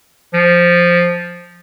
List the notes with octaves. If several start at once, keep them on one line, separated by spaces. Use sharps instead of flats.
F3